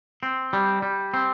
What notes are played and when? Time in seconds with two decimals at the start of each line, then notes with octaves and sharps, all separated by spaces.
0.23 C4
0.53 G3
0.82 G3
1.14 C4